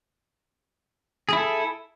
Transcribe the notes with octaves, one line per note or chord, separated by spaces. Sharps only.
E4 G#4 A4